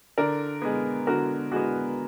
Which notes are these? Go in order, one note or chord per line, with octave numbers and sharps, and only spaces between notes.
D3 A#4 D5
G#3 B3
D3 F#4 A#4
G#3 B3 F#4